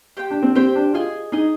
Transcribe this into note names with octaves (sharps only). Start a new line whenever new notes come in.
G4 C5 G5
D4
C4
C4 G4 C5 G5
D4
F4 G#4 D#5 G#5
D#4 G#4 D#5 G#5